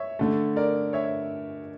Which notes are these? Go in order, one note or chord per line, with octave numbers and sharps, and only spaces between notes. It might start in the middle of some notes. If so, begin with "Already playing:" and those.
Already playing: C#5 E5
D3 A3
A#4 D5
C#5 E5